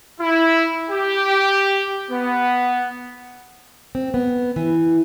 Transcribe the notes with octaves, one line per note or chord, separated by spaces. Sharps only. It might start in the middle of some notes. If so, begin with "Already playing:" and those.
E4
G4
B3
C4
B3
E3